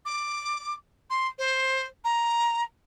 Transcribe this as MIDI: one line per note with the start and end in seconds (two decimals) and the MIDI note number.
0.05 0.73 86
1.10 1.27 84
1.38 1.85 72
2.04 2.63 82